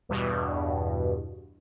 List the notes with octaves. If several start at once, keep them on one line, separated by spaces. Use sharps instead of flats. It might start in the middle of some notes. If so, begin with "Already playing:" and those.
E2 G2 B2